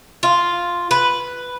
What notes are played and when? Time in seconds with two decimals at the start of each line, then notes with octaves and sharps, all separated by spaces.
0.23 F4
0.91 B4